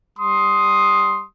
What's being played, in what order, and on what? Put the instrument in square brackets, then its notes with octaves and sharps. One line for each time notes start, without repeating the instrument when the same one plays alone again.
[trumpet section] G3 C6 D#6